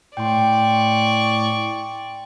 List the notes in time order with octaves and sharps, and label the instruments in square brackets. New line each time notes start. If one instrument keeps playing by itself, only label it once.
[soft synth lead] A2 [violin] D5 C#6 [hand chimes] G5 C6